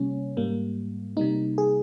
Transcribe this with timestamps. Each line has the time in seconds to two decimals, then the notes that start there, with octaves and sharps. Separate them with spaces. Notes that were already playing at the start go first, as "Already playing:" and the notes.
Already playing: C3 G3 A#3 C#4
0.37 G#2 G3 A#3
1.17 C3 G3 A#3 D#4
1.58 G#4